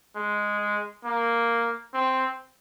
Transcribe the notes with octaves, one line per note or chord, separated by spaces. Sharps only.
G#3
A#3
C4